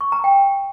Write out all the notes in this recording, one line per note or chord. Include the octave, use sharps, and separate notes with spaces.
C#6
A#5
G5